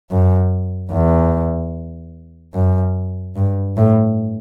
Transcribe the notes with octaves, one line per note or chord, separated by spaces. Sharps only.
F#2
E2
F#2
G2
A2